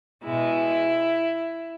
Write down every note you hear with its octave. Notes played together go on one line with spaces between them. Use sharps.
B2 G#3 E4